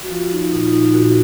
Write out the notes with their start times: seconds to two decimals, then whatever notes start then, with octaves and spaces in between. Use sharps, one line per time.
0.03 F#4
0.10 F3 F4
0.32 D#4
0.53 A#2 D#4
0.65 F4
0.72 D#4
0.94 A#2 F#4